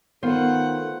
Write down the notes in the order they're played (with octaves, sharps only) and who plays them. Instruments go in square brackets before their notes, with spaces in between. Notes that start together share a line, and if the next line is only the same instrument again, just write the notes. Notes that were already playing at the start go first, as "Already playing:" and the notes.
[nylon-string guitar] D#3 [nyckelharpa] A3 F#5 [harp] B3 F4 C5